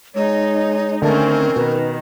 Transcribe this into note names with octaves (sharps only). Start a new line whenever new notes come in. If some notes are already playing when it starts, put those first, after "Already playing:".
G#3 D#4 C#5
D3 D#3 A3 C4 C#4 A#4 A5
B2 D#3 B4